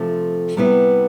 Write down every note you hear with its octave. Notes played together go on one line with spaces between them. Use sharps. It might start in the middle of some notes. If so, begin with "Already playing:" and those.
Already playing: C3 F3 A3
C3 G3 B3 E4 B4